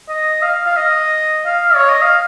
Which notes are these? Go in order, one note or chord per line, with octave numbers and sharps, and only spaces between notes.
D#5
F5
F5
D#5
F5
C#5
D#5
F5